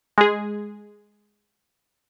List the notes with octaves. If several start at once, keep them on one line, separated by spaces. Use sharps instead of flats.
G#3 G#4